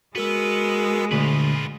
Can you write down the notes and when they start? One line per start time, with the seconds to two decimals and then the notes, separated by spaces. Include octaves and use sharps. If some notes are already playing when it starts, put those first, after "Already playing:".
0.16 G#3 B3 F#4 A#4 E6
1.12 D2 A#2 F4 B4